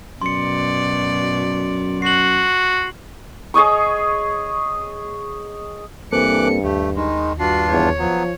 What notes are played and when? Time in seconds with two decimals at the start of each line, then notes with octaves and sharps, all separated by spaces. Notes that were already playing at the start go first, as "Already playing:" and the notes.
0.21 F#2 B2 D5 C6 C#7
2.02 F#4 C7 F#7
3.54 G#4 C#5 D#5 C#6
6.12 G2 E3 A#3 C4 A4 D6 F#6 C#7
6.64 D#2 A3 G4
6.96 D#3 G#3 D#4
7.40 G2 D4 F4 F#4 C7
7.71 E2 C#5
7.99 F3 F#3 B3